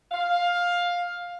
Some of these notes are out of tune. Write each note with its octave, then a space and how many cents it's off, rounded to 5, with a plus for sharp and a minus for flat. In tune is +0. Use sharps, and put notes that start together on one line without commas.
F5 +10